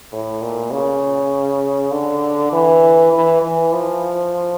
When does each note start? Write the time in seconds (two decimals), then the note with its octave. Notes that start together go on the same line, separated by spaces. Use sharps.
0.13 A2
0.42 A#2
0.72 C#3
1.92 D3
2.53 E3
3.13 E3
3.42 E3
3.73 F3